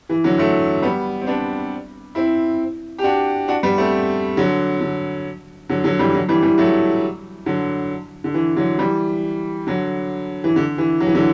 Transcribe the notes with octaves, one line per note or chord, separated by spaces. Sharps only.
E3
D3 F#3
F#3 A3
G3 B3
C4
B3 D4
C4 E4
G4
D4 F#4
D4 F#4
G3 B3
A3 C4
D3 F#3
D3
D3 F#3
D3 F#3
E3 G3
D3 F#3
E3 G3
E3 G3
F#3 A3
D3 F#3
D3
E3
D3 F#3
E3 G3
D3 F#3
E3
D3
E3
F#3
E3
D3 F#3